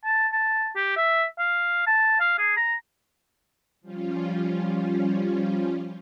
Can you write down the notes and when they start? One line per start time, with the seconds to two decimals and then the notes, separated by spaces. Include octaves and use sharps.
0.05 A5
0.33 A5
0.76 G4
0.97 E5
1.39 F5
1.87 A5
2.20 F5
2.38 G#4
2.57 A#5
3.81 F3 G3 C#4 F4